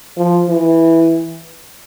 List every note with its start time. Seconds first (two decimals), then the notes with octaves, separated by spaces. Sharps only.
0.17 F3
0.49 E3